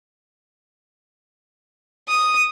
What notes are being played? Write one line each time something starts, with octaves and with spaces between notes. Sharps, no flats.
D#6